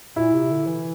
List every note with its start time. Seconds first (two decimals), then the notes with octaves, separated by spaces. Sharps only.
0.16 A#2 E4
0.33 C3
0.51 D3
0.67 E3